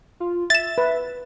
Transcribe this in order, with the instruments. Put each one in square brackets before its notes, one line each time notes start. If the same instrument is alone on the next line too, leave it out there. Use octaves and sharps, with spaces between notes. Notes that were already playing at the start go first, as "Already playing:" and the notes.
[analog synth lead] F4
[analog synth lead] E5 [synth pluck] A6 E7
[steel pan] B4